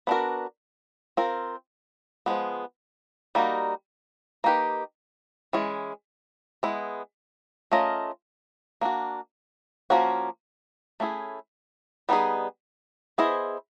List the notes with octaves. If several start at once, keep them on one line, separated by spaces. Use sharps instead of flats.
B3 D4 F#4 A#4
C4 F4 A#4
F3 G#3 B3
G3 A#3 D#4 F#4
A#3 D#4 G4 B4
E3 G#3 C#4
G#3 B3 E4
A3 C#4 F4 A#4 D#5
A#3 D4 F#4
F3 A#3 C#4 F#4
A3 C#4 E4 G#4
G3 B3 D#4 G#4
B3 E4 G#4 C5 D#5